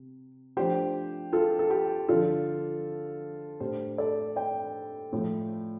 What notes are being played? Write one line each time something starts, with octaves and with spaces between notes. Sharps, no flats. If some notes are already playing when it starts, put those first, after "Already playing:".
Already playing: C3
F3 A3 D4 G4 C5
F4 A4
A4
G4
D3 F3 D4 F4 A4
A2 A3 D4 G4 C5
A4 D5
D5 G5
A2 F3 A3